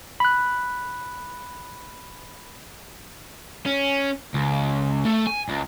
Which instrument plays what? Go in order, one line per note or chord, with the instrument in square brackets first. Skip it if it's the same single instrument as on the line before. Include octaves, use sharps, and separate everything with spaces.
[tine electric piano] B5 F#6
[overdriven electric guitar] C#4
C#2
A3
G#5
C#2